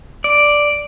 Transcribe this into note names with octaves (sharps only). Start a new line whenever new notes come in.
D5